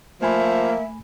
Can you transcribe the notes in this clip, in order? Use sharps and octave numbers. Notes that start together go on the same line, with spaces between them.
F3 A3 A#3 E5 G#5 B5